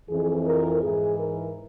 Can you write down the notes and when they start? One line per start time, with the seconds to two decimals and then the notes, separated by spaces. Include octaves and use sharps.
0.09 F2 E3 G#4
0.46 A#4
0.82 G#2 E3 G#4
1.19 A#4